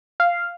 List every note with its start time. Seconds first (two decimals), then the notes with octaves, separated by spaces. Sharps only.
0.20 F5